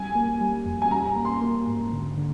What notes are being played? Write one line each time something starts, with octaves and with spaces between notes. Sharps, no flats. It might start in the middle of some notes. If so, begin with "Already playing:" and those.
Already playing: G3 G#5
A#3
G3
F2
G#5
G3 A#5
A#3
C6
A#3
G#2
D3
D3